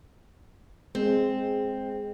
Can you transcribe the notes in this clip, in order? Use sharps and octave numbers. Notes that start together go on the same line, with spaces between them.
G#3 C4